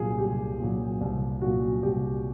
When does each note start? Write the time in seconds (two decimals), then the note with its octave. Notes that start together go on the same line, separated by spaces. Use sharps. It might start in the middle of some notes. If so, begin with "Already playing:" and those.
Already playing: C2 A#2 F#3 G#4
0.18 C2 G4
0.60 A#2 F#3
1.01 C2
1.41 A#2 F#3 F#4
1.83 C2 G4